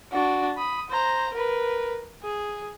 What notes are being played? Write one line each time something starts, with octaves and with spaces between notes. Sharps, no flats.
D4 F#4
B5 D#6
C5 A#5
A#4 B4
G#4